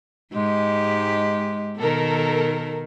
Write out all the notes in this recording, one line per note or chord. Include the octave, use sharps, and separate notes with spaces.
G#2 G#3 G4
B2 D#3 A4 A#4